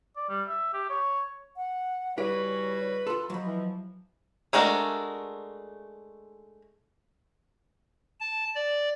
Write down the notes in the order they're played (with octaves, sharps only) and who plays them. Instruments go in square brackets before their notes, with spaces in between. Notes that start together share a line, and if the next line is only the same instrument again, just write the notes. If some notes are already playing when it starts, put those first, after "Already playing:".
[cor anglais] D5
G3
E5
G4
C#5
[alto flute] F#5
[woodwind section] C#3 G3 F#4 [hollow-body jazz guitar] E4 G4 [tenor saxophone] B4 [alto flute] C#5
[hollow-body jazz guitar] F4 A4 [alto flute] C6
[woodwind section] F3 [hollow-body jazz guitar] F#3 B5 [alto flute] D#5
[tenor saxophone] E3
[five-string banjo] G#3 A3 D4 F#4 A#4
[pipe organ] A5
D5